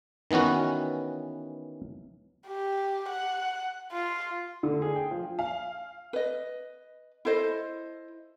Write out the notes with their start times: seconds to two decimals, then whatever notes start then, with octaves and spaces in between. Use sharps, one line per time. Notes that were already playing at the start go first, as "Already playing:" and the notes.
0.31 D#3 E3 B3 C#4 F#4
2.47 G4
3.09 F#5
3.92 F4
4.63 D3
4.82 G#4
4.96 G5
5.11 F3
5.39 F5
6.13 B4 D#5
7.25 E4 A4 C5 D#5